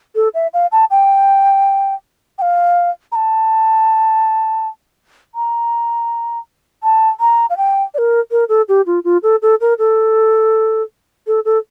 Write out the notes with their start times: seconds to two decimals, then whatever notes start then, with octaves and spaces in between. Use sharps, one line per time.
0.16 A4
0.34 E5
0.54 F5
0.72 A5
0.91 G5
2.38 G5
2.42 F5
3.12 A#5
3.16 A5
5.35 A#5
6.83 A5
7.20 A#5
7.50 F5
7.57 G5
7.94 D5
7.98 A#4
8.31 A#4
8.49 A4
8.69 G4
8.87 F4
9.05 F4
9.23 A4
9.42 A4
9.61 A#4
9.79 A4
11.27 A4
11.45 A4